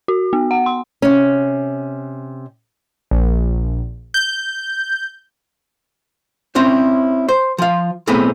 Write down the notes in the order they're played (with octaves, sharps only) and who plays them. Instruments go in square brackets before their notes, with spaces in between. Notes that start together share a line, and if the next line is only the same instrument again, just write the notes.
[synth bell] F#4
B3
F#5
C6
[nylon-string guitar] C3 C#4
[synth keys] A#1
G6
[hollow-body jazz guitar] C4 C#4 E4 C5
C5
F3 F5
B1 A2 B3 C4 G#4 B4